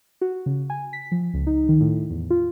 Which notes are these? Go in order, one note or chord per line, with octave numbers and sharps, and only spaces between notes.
F#4
C#3
G#5
B6
F3
C#2
D#4
D#3
A2
E2
F4